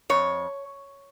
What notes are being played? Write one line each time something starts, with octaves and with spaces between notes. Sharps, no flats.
F2 C#5